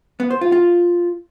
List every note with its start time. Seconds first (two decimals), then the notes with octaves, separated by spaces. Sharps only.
0.20 B3
0.31 C5
0.41 F4
0.52 F4